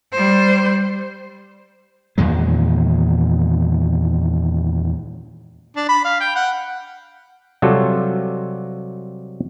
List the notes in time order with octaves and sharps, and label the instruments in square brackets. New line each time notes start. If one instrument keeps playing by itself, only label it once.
[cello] G3 C5
[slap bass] E2 A#2 D#3 G#3
[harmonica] D4
B5
F5
G5
F#5
[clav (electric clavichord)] C3 F#3 G3 F4 F#4 A4